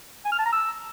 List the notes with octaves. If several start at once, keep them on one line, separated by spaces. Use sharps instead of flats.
G#5
F6
A5
A#5
E6